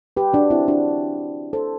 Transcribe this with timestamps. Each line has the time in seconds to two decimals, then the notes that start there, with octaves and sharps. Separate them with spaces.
0.17 G4 B4
0.33 D4 F#4
0.50 C4 E4
0.68 D4 F#4
1.53 A4 C5